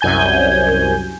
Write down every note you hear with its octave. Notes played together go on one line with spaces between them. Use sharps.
C2 F#2 G#5 G6